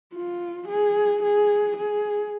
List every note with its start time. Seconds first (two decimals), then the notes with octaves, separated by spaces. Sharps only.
0.14 F4
0.69 G#4
1.23 G#4
1.77 G#4